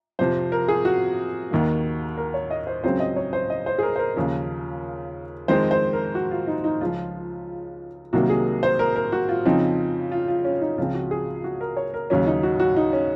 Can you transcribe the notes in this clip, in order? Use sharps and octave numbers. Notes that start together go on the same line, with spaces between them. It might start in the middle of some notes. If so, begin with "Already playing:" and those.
F2 C3 F3 C5
A#4
G#4
F#4
D#2 D#3 A#3
A#4
C#5
D#5
C5
C#2 C#3 F#3 C4 C5
D#5
C#5
C5
D#5
C5
G#4
A#4
C5
A#4
D#2 C#3 F3
F2 D#3 G#3 C4 C5
C5
A#4
F#4
F4
D#4
D#4
C#2 C#3 F3 F4
C2 C3 D#3 F#3 A#3 F#4
G#4
C5
A#4
A#4
F#4
F4
F2 C#3 F3 C4 D#4
F4
F4
C#4
D#4
C#2 C#3 F3 C4 F4
F#4
G#4
F#4
A#4
C#5
A#4
D#2 C#3 F#3 C#4
D#4
F#4
F#4
D#4
C#4